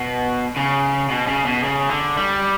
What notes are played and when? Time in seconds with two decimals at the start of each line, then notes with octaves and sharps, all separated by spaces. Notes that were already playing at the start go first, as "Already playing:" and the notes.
Already playing: B2
0.56 C#3
1.09 B2
1.27 C#3
1.45 B2
1.64 C#3
1.90 D3
2.17 G3